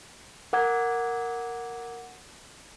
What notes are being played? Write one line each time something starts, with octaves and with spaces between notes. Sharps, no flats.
A#4 F#5 D6 G#6